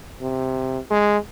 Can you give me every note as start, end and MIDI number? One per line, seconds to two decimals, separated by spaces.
0.21 0.79 48
0.90 1.18 56